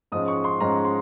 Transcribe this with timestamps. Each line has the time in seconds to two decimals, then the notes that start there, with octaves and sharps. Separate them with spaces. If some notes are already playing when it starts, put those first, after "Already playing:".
0.12 G#2 F3 G#3 C#4 D#6
0.28 C#6
0.44 C6
0.60 G#2 F3 G#3 C#4 A#5
0.85 C6